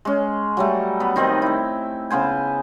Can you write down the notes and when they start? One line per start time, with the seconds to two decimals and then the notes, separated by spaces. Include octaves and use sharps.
0.05 G#3 C#4
0.57 F#3 G3 A3
1.00 B3
1.16 D#3 C4 D#4 D#5
1.42 A3 E4
2.10 C#3 B3 C5 G#5